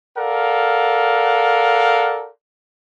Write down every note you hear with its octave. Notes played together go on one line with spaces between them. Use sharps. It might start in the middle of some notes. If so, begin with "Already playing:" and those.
A4 A#4 D5 F5 F#5